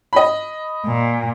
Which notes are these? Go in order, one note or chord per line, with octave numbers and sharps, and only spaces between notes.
D#5 B5
A#2